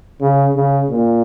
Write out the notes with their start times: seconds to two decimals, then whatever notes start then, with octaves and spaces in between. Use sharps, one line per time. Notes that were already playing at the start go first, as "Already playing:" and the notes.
0.21 C#3
0.56 C#3
0.90 A#2